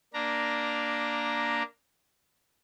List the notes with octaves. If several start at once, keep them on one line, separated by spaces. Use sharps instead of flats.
A#3 D4 A#5